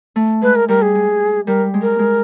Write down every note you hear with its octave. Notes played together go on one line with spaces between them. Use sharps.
A3
G#3 B4
A#4
G3 A#4
G#4
G#3
G3 A#4
G#3
A#4
G#3